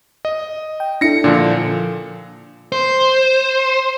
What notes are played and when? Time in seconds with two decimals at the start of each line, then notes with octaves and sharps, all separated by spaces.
0.25 D#5
0.80 G5
1.01 D4 E4 A4 A#6 C#7
1.24 A#2 D3 F3 D4
2.72 C5